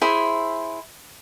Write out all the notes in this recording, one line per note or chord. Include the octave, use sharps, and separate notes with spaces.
E4 G#4 C5 E5